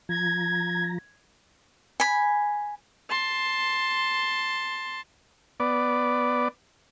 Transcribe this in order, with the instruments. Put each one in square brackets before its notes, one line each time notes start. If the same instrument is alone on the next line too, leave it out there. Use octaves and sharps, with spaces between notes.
[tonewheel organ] F3 A#5 [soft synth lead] G#6
[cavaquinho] G#5 B5
[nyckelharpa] A5 C6
[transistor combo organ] B3 D5